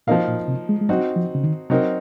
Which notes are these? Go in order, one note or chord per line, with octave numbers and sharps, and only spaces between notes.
A#2 F3 A#3 D#4 A#4 F5
A#2
C3
G#3
G#3
F#3 C4 D#4 F#4
F3
C#3
D#3
C3 F#3 C4 D#4 A#4